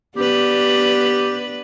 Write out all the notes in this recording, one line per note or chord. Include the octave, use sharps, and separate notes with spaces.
B3 D4 G4 B4